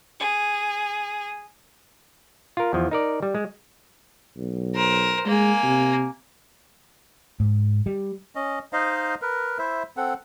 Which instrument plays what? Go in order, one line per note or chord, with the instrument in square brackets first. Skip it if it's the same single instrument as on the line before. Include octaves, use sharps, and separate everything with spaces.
[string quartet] G#4
[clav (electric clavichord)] F4 A#4
E2 F3
D#4 A#4 D5
G3
G#3
[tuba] B1
[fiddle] A#4 C5
[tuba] G#3 [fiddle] A#3 G#5
[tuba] C3
[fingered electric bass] G#2
G3
[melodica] C#4 D#5
D#4 C5 D#5 F5
A#4 B4
E4 C5 E5
C4 A4 F#5